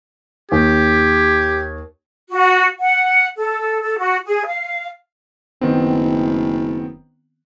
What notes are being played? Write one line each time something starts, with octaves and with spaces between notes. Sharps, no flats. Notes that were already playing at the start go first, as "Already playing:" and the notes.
D#2 G4 G#6
F#4
F#5
A4
A4
F#4
G#4
F5
F#1 D#3 B3 C4